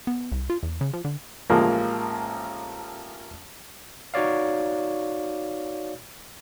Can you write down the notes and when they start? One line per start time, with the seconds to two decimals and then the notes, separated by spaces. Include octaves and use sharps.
0.07 B3
0.32 C2
0.50 F4
0.63 E2
0.81 C#3
0.93 F3
1.05 D3
1.50 A1 F3 G#3 A#3
4.14 D#4 F#4 C#5 D5 F5